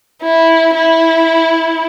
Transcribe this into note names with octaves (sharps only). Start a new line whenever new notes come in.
E4
E4